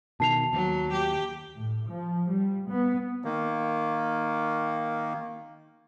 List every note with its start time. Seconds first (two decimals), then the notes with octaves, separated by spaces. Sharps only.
0.20 B2 D#3 A5 C7 F7
0.53 D#2 F#3
0.92 G4
1.58 A2
1.89 F3
2.28 G3
2.68 B3
3.24 D#3 A#3